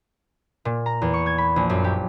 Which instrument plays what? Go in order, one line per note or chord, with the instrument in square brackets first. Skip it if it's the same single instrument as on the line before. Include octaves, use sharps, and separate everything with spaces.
[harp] A#2
A#5
E2
C#6
G#6
B5
A#1
F#2
G4